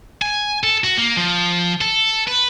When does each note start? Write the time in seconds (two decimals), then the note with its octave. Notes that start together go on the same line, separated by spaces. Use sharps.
0.22 G#5
0.63 A4
0.84 F#4
0.98 A#3
1.17 F3
1.81 A4
2.28 B4